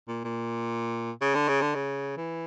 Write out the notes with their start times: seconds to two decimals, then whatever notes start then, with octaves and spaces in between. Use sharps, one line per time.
0.08 A#2
0.24 A#2
1.21 C#3
1.35 D3
1.48 C#3
1.62 D3
1.75 C#3
2.17 E3